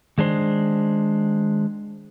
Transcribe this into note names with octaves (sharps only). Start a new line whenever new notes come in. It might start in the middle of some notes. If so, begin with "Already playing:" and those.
D#3 G#3 D4 C5